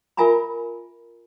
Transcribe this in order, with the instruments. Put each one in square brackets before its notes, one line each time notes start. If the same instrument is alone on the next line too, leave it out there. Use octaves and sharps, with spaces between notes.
[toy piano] F4 A#4 E5 G#5 A#5 B5